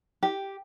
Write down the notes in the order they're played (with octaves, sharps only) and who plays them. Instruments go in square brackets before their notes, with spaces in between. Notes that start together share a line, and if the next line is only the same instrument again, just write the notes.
[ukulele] G4